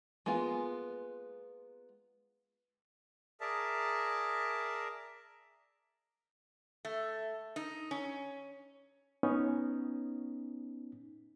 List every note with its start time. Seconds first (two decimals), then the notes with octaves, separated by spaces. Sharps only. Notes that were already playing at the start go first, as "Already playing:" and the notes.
0.26 G#3 A#3 B3 F4
3.41 G#4 A#4 D5 E5 A5 A#5
6.85 A3
7.56 D#4
7.91 C#4
9.23 B3 C#4 D#4